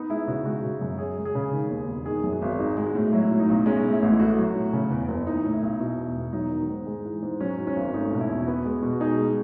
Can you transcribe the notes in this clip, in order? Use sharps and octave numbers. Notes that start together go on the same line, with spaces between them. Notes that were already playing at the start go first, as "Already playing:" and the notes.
Already playing: B3 D#4
G#3 E4
C#3 F#4
G#3 F#4
C#3
F#2
C#4 G#4
G#3
G#4
C#3
D#3
D#2
E1
D#3 G#4
F#2
F#4
G#1
D#4 G#4
G#3
F#4
A2
F#3 E4
A2
D#4
B1
G#3 C#4
A2
E4
A1
E4
A3 F#4
F#3
A2
C#3
E2
F#1
E3 D#4
A2
E4
B1
B2 E4
E2
E1
F#3 D#4
D#3
G#2
G#3
E3
G#2
F#3 C#4
G#2
C#4
G#1
A3 D#4
B2 F#4
E4
E2
B3 F#4
G#3
B2
F#4
D#4 G#4
G#3